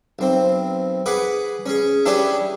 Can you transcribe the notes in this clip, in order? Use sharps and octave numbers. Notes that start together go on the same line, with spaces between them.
B1 C4
G#4 B4 F#5 D6
C#4 G#4
D4 E4 G4 G#4 B4 C#5